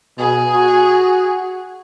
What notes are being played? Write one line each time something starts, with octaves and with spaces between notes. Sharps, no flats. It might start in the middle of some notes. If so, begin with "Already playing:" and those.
B2 G#4
F#4